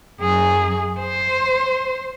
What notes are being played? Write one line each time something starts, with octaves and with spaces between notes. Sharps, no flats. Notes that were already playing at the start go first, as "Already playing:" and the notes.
F#2 G#4
C5